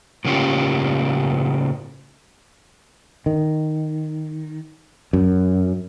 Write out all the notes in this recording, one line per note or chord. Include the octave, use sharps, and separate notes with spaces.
A2 C#3 A#3 C#4 F4 G4
D#3
F#2